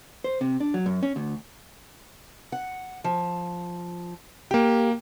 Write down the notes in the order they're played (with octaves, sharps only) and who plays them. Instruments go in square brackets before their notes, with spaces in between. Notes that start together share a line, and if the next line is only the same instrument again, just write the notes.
[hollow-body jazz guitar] C5
C3
D4
F#3
F#2
C#4
D2
[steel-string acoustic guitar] F#5
F3
[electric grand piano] A#3 G5 [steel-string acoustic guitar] G4